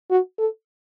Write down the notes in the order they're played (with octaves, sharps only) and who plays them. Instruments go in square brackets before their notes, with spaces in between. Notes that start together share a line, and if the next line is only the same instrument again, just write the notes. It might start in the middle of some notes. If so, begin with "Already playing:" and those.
[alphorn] F#4
A4